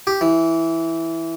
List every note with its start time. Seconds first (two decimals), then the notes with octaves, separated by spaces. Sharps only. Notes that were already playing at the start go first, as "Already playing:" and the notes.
0.07 G4
0.21 E3